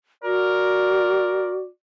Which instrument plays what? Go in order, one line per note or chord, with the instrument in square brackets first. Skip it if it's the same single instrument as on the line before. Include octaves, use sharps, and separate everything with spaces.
[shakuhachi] F#4 [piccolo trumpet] A#4 [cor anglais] D5